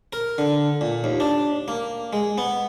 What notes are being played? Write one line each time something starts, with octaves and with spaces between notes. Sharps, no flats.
A#4
D3
A#2
D#2
D4
A#3
G#3
B3